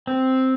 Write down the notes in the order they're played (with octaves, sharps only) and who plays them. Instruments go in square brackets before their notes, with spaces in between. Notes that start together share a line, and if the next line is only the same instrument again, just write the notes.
[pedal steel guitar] C4